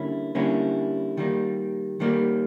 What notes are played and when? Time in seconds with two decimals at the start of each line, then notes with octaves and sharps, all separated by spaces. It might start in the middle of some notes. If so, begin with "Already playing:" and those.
Already playing: D3 G3 A#3 C#4 E4
0.35 D3 G3 A#3 C#4 E4
1.17 D#3 G3 A#3
2.00 D#3 G3 A#3